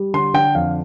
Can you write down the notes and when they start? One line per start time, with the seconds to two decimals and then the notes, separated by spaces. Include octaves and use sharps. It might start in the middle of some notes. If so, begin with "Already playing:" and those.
Already playing: G3
0.14 D3 C6
0.34 D3 G5
0.55 F2 F5